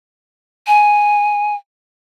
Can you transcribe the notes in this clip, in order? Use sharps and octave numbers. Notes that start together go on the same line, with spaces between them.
G#5